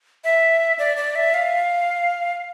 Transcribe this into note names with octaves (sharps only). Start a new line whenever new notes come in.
E5
D5
D5
E5
F5